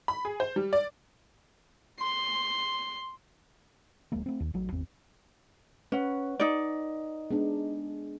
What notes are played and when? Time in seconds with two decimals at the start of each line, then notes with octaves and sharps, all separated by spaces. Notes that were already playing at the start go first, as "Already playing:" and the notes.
0.08 B5
0.25 G#4
0.40 C5
0.56 G3
0.73 D5
2.00 C6
4.12 D1 F#3 G#3 A#3
4.26 A3 C4
4.40 D#2
4.54 A1 A2 F#3
4.72 G#1 E2 C4
5.92 C#4 B4 F#5
6.40 D#4 D5
7.31 G#3 B3 D4